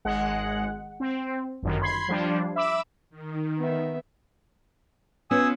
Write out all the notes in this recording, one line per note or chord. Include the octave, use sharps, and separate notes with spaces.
G#1 G#3 F#5
C4
G1 F#2 D#3
B5 C6 G#6 C7
F3 G3 D4
E5 B5 D6 E6
D#3
B3 E5
B3 C#4 F4 G#5 D#6 E6